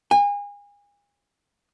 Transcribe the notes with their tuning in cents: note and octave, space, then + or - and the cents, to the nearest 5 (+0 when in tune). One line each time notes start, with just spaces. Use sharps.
G#5 -35